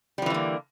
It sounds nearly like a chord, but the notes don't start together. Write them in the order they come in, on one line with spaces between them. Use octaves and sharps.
G3 F3 E3 D3 A#3